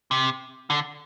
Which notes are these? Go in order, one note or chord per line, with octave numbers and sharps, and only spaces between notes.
C3
D3